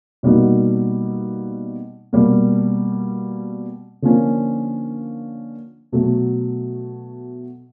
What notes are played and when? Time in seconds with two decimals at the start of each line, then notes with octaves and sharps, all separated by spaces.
0.23 B2 G3 A#3 D#4 F#4
2.13 B2 G3 A#3
4.02 D3 F3 A#3 C#4
5.92 B2 F#3 A3